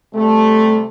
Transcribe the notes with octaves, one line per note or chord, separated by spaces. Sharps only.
C3 G3 A3